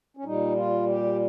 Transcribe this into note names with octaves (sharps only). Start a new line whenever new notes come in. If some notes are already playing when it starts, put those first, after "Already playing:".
C#4
A#2 G3 D#4
F4
G4